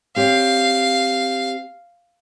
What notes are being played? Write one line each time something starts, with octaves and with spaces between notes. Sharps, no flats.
C4 G4 C#5 F5